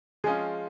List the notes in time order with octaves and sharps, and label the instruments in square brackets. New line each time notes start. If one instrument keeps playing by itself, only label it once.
[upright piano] F3 G#3 C#4 F4 [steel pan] G#4